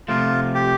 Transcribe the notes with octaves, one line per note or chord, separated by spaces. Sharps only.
C3 F3 A3 F4
G4